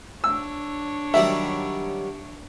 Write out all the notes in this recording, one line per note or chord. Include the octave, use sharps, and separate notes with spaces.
D4 C#5 E6
D#3 F#3 G3 E5